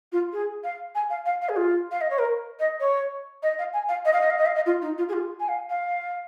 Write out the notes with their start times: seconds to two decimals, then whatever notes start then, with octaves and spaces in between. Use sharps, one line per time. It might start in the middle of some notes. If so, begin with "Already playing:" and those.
0.12 F4
0.33 G#4
0.64 F5
0.95 G#5
1.10 F5
1.26 F5
1.41 F5
1.49 G#4
1.56 F4
1.91 F5
2.01 D#5
2.10 C#5
2.19 A#4
2.60 D#5
2.80 C#5
3.43 D#5
3.59 F5
3.73 G#5
3.89 F5
4.05 D#5
4.13 F5
4.21 D#5
4.30 F5
4.38 D#5
4.46 F5
4.55 D#5
4.66 F4
4.82 D#4
4.98 F4
5.09 G#4
5.13 F4
5.40 G#5
5.48 F5
5.70 F5